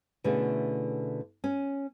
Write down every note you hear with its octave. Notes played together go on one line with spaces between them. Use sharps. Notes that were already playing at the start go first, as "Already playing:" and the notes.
B2 D3 A3 C#4 E4 G#4
C#4